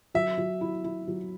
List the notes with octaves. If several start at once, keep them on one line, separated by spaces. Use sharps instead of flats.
F#3 E5
F#3
E4
E4
F#3